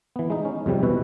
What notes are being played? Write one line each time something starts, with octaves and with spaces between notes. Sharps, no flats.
E3 B3
G#3 D#4
C#4
F2 G#2 C3 G3
B2 E3 B3 F#4 B4 E5